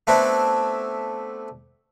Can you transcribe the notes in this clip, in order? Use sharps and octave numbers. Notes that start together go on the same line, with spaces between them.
A3 B3 C4 D4 E4